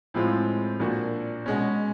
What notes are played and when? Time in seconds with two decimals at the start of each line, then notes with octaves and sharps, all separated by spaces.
0.14 A2 F3 G#3 C4 F4
0.80 A#2 F3 A#3 D4 F#4
1.46 B2 G#3 C#4